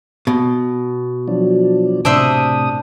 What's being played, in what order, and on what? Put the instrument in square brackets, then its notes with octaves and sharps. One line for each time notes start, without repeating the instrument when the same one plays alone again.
[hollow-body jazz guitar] B2
[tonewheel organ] F3 F#3 D4
[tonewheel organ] A2 C3 D#6 [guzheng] D4 C5 E5